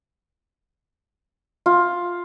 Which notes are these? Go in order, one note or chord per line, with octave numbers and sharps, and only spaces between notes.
F4